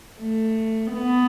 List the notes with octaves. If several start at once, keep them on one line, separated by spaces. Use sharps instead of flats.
A3
B3